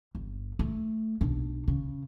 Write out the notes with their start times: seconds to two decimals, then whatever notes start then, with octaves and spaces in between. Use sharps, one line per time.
0.15 G1
0.59 A3
1.21 B1 D4
1.68 C#3